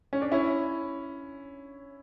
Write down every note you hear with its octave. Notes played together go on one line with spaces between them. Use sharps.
C#4
D4
C#4 E4